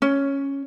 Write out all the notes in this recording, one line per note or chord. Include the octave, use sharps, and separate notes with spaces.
C#4